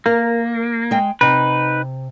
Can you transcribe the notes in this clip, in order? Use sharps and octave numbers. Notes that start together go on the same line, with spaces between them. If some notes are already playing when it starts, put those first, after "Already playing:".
A#3 A#4
G#3 G5
C3 D#4 B4